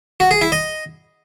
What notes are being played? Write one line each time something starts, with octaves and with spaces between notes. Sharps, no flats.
F#4
G#4
E4
D#5